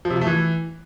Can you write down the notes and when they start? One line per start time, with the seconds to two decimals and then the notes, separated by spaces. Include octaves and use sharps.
0.05 F3
0.10 C3
0.16 F3
0.21 A3
0.27 E3